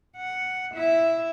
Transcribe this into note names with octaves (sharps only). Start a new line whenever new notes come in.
F#5
E4 E5